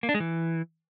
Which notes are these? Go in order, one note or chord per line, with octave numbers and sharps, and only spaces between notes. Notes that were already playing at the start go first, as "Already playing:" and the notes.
A#3
D4
G#3
E3